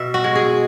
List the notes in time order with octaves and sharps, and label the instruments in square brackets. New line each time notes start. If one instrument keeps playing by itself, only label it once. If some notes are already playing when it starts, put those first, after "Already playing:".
Already playing: [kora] B2 E5
F#4
G#3
G#4